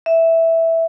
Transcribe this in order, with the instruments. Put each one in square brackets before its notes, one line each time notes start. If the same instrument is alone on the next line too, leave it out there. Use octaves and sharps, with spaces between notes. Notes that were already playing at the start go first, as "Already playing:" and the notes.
[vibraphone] E5